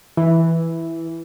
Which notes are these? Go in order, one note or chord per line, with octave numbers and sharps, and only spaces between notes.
E3